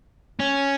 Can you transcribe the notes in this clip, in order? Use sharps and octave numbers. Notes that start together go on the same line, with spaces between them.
C#4